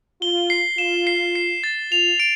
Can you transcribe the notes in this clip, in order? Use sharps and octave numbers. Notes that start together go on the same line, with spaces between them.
F4 G7
C7
F4 E7
C7
C7
A6
F4 F7
D7